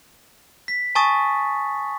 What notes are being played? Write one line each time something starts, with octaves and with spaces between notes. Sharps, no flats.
B6
G#5 A5 C#6 D#6 A6